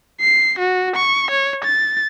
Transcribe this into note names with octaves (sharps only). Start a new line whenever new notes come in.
C7
F#4
C#6
C#5
A6